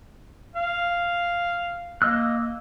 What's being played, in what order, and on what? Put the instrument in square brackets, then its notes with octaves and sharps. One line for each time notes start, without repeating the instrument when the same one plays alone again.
[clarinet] F5
[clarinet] A#3 [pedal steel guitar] D#5 E6 F#6